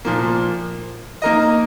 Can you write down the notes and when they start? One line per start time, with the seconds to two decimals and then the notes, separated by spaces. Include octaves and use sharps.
0.05 A#2 F3 A#3
1.22 A#3 D#4 A#4 D#5